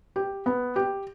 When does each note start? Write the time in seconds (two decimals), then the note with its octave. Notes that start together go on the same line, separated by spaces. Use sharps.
0.16 G4
0.46 B3
0.76 G4